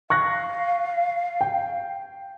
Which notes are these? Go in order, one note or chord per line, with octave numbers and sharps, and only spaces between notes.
F5 C#6 F#6 A#6
G5